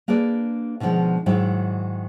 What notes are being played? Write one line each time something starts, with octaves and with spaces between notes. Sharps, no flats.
A#3 D4 G#4 B4 D5
B2 D3 D#3 F3 G#3
G#2 D#3 F#3 E4